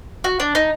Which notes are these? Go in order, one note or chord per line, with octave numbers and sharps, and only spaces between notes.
F#4
D4
D#4